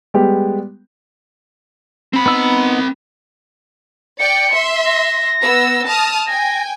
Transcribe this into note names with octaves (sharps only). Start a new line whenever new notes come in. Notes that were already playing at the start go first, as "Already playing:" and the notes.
G3 G#3 B3 G4
C4 B5
B3 D#4 E6
D5 G5 C#7
E5 C6
A#6
B3 E6
A5 D#6 F6
G5 G#5 A#6